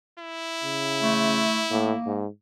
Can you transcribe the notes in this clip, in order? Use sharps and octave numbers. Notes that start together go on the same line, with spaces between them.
E4
C#3
A3
A2 A#3
G#2